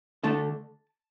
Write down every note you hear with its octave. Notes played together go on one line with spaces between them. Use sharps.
D3 A3 D4 A5